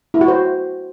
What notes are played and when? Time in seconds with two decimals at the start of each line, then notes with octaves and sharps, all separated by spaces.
0.14 E4
0.21 F#4
0.28 C5